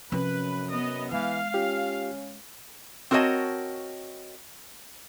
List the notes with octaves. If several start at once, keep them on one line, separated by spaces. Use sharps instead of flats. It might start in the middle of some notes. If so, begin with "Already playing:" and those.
F#2 C3 F3 C#4 B4
B3 D#5
E3 G#3 F5
C#4 F4 G4
C4 F#4 A#4 C#5 D#5 A5